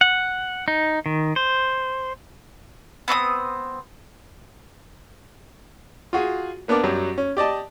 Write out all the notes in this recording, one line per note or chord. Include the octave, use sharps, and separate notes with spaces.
F#5
D#4
D#3
C5
B3 C4 D6 D#6
F4 F#4 G#4
A#3 B3 D4 A#4 D5
F#2 F#3 G3
C#4
G4 D5 D#5 A5